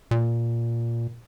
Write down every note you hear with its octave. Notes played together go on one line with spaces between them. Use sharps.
A#2